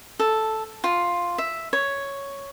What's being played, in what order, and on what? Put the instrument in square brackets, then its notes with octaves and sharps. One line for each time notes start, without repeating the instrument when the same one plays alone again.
[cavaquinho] A4
F4
E5
C#5